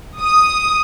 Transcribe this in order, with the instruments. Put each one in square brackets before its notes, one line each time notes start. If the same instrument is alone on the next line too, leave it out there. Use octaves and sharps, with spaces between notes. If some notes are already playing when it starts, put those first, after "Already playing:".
[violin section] D#6